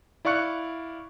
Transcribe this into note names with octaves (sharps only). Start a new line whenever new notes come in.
E4 D5 F5 C#6 F#6 C#7